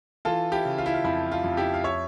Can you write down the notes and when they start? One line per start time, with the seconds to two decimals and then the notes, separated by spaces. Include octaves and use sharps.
0.25 E3 F4 A4
0.52 E4 G4
0.65 C#3
0.78 F4
0.86 E4
0.94 F4
1.04 F2 E4
1.32 F4
1.44 F2
1.57 E4 G4
1.74 F5
1.84 C#5 E5